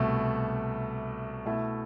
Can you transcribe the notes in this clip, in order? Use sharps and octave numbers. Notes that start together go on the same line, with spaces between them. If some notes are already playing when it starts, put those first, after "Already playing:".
Already playing: C2 B2 A3
B2 A3 E4